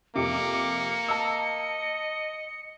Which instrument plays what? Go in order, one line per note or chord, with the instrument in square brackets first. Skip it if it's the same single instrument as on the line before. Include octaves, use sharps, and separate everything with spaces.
[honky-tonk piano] F2 C3 [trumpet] A#3 [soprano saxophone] D6 [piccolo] C#7
[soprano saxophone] D#5 [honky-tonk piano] A5 E6